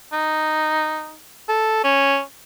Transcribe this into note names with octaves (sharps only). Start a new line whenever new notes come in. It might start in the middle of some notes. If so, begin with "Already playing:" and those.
D#4
A4
C#4